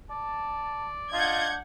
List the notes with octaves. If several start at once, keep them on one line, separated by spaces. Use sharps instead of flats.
D5 A5
D4 F4 D#5 F#5 G6 G#6